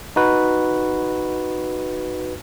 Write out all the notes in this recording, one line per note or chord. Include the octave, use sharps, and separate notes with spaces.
D#4 F#4 B4